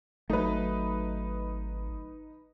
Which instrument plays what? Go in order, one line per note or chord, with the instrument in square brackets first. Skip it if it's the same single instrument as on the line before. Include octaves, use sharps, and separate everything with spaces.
[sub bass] G#1 [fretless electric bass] F#3 A3 [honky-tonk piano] D#4 B4